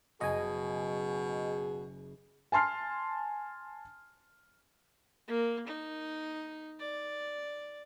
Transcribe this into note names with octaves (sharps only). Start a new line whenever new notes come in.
F#1 B2 G#4 D#5 G#5
G#5 A5 C6 F6 C7
A#3
D#4
D5